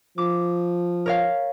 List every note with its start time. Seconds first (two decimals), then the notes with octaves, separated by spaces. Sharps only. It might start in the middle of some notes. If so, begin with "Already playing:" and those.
0.18 F3 D6
1.06 A#4 C#5 F5